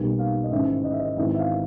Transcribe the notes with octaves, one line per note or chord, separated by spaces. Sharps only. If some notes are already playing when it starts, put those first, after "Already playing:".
Already playing: B1 B2 G3 A#3 D#4
F5
D#5
A1 G#2 D#3 E5
D#5
E5
D#5
G#1 G#2 E3 E5
E5
F5